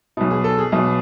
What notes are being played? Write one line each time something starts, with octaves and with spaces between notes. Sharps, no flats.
B1 B2
G#4
A4
G#4
B1 B2